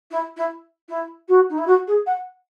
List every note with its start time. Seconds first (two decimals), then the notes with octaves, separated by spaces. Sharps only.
0.11 E4
0.37 E4
0.89 E4
1.28 F#4
1.50 D#4
1.58 E4
1.67 F#4
1.88 G#4
2.06 F#5